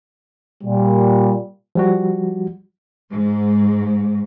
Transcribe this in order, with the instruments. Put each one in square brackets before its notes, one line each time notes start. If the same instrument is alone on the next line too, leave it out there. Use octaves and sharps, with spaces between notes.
[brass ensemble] A#2 G3
[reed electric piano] F3 G3 F#4
[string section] G#2